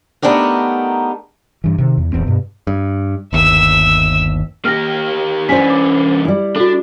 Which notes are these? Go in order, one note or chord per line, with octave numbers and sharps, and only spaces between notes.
A3 B3 D4 D#4 G4 A#4
G2 E3
C3 D#3
E2
D1 E2 C4
G2 B2
G2
G1 D#2 E5 E6
A#3 G4 F6 A#6
E3 C#4 D4 B4 C5 B6
D6
G3 E4
D4 F#4 A4